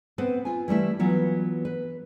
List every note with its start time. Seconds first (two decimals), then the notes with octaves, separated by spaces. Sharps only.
0.18 B3 C4 B4 C5
0.45 F4 G#5
0.68 E3 G3 A3 E4
0.99 E3 F#3 B3 F4
1.65 B4